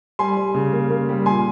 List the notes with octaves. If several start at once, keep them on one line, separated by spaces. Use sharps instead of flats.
G3 G#5 C6
G3
C#3
A#3
A#3
G3
A#2 G#5 C6